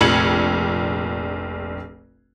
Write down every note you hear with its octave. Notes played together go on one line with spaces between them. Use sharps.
F1 A#1 G#6 C#7 F#7